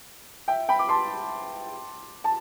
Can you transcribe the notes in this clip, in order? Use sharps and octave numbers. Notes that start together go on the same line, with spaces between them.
E5 G5
G5 B5
D6
A5 C6
A5